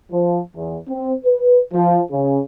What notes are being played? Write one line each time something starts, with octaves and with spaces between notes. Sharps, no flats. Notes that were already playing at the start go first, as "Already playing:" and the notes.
F3
E2
C4
B4
F3
C#3